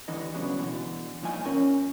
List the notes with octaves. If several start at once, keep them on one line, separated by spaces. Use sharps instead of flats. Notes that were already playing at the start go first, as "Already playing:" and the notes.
D#2 D3 E3 D#5
E2 G2 C#3 F#3 B3 D4
B2 D3 E3
C2 A#2 F3 D#4 G#5
C#4 A#4 G#5